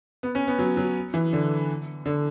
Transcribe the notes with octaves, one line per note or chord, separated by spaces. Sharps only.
B3
C#4
B3
F#3
F#3
E3
D3
D3